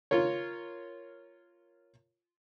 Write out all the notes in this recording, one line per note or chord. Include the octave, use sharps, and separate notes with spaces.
F4 A#4 C#5